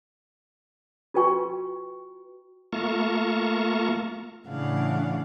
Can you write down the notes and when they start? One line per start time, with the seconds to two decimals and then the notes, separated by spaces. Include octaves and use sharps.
1.14 F4 F#4 B4 G5 C#6
2.73 A3 A#3 F4 A5 A#5 C#6
4.48 A2 C#3 E3 D4 F5 F#5